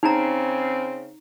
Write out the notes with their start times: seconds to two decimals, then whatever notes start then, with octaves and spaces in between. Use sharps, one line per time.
0.03 C#3 C4 D#4 A#5